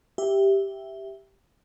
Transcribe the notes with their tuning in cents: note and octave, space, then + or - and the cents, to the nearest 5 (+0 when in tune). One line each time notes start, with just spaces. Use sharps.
G4 +0 E5 +0